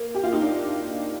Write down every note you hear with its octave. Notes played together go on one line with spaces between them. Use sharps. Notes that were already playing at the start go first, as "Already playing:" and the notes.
Already playing: A#3
G4
F4
D#4
D4